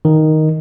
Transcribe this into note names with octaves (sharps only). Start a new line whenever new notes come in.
D#3